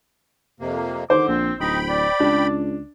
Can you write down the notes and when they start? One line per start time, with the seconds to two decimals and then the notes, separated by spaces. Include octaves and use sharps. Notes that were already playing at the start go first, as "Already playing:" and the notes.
0.60 F2 C3 A#3
1.10 D3 D#3 C5 D6
1.28 A#1 C4
1.60 D1 D#4 G5 B5
1.89 D5
2.20 C#2 D4